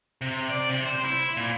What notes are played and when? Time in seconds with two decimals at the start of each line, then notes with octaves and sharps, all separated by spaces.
0.21 C3
0.50 D5
0.69 C3
0.86 C5
1.04 E4
1.37 A#2